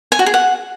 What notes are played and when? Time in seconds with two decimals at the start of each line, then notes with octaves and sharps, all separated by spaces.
0.12 G#5
0.19 F#4
0.26 G#4
0.34 F#5